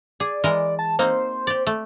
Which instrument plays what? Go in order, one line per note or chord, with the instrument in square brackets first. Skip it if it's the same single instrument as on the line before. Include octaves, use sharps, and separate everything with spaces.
[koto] G#4 [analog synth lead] D5
[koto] E3 G#3 A#4
[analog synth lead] A5
[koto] A#3 C4 D#4 [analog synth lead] C5
[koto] G4 D5
A3